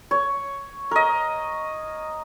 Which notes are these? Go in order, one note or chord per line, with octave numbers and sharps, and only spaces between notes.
C#5
A#4 D#5